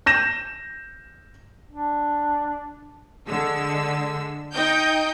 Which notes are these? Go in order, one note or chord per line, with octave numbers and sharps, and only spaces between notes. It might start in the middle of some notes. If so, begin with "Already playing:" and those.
G6 A#6 E7
D4
D3 G#3 E6
D#4 D#5 G5 G6